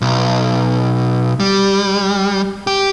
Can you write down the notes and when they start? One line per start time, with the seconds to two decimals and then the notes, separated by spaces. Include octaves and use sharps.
0.01 B1
1.40 G3
2.67 G4